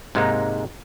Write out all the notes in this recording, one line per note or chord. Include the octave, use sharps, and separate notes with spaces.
G#2 C3 G#3 A#3 D#4